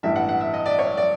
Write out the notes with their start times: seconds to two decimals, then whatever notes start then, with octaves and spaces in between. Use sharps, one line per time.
0.03 A1 G2 E3 E5
0.16 F#5
0.29 F#5
0.41 E5
0.54 D#5
0.66 D5
0.79 C#5
0.97 D5